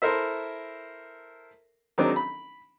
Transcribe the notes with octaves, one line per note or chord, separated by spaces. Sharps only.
E4 A4 A#4 C5 E5
D#3 F#3 G#3 C4 D4 D#4
B5